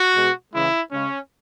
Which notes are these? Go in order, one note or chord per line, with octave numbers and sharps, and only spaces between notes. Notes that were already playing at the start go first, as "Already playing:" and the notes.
Already playing: F#4
B2 G#3
C#3 E3 G#3 E4
C#3 G#3 C#4